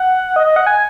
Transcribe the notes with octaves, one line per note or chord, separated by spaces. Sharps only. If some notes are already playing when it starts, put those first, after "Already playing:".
Already playing: F#5
D#5
D#5
F#5
G#5